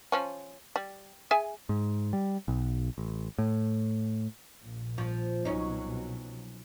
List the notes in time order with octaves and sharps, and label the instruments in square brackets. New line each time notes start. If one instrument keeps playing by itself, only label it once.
[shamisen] F3 C#4
G3
G#4 E5 G#5
[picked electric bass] G#2
G3
B1
A1
A2
[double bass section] A#1 A#2
[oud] F3
[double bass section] C2 B2 F#3 [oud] C#4 D#4